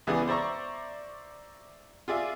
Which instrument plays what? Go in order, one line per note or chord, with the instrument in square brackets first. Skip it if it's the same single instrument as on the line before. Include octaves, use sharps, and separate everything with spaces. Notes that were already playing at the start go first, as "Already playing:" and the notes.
[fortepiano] C#2 E3 B3 G#4 D5 D#6
C5 D5 E5 A#5 C#6
F4 G#4 D5 E5